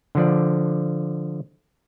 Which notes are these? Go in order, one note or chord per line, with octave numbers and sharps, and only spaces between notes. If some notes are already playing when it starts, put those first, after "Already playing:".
D3 F3 D5